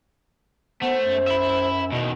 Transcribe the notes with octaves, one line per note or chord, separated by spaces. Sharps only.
A3 B3 C5
F#2
E5 B5
E2 B2 D#3